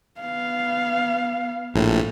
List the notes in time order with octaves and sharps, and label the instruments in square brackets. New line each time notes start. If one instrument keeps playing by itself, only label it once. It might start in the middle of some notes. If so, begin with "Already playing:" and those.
[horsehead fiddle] B3 F5
[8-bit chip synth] A#1 A2